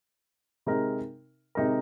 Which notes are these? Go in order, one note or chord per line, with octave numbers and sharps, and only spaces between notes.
C3 G#3 D#4 A#4
C3 G#3 D#4 A#4